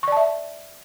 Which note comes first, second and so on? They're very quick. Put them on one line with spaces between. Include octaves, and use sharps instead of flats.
C#6 D5 A5 E5